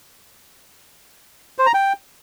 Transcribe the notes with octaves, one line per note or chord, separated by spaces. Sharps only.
C5
A#5
G5